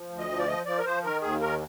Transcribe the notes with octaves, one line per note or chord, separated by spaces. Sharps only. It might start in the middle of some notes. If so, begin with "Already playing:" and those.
Already playing: F3
D2
D#5
F3
D5
F3 D#5
F3 D5
A#4
F3 C5
D#3 A#4
D#2 G#4
D#3 A#4